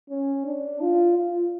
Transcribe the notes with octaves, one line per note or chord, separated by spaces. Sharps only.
C#4
D4
F4
F4